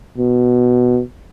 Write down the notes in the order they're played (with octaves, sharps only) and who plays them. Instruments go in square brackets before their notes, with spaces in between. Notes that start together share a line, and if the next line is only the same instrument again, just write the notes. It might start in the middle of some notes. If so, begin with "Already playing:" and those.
[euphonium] B2